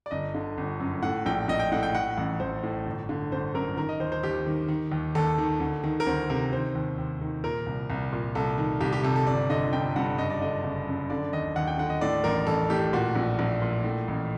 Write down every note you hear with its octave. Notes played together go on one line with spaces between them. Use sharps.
D5
G1 D#5
D3
G1
F#2
A2 F#5
A#1 G5
A#1 D#5
G5
A2 F#5
G5
A2 F#5
A1 F#5
A1 C5
A2
G1
D3
G1 C5
F#2 A#4
D#3 A#4
D#5
D#2 C5
C5
D#2 G4
D#3
D#3
D#2
D#2 A4
D#3
D2
D#3
A#4
D2 C5
C3 A#4
D#3 C5
D#2
D#2
D#3
A#2 A#4
C2
C2
A#2
C2 A4
D#3
C2 G4
G4
C3 A4
A4
G1 D5
D3 D#5
G1 G5
G2 F#5
F#1 D#5
D5
D3 D#5
F#1
F#2
D3 D5
D#2 D#5
D#2 F#5
G5
D3 F#5
D#5
A2 D5
A1 A#4
A1 A4
A2 G4
A#2 F#4
A#1
A#1
A#2
A2
A1